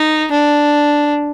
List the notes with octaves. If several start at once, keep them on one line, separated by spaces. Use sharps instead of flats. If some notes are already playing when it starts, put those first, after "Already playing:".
Already playing: D#4
D4